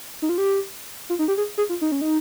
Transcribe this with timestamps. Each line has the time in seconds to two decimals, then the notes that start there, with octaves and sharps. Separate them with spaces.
0.22 D#4
0.29 F4
0.38 G4
1.10 F4
1.19 D#4
1.28 G4
1.37 G#4
1.58 G#4
1.69 F4
1.81 D#4
1.92 C#4
2.01 D#4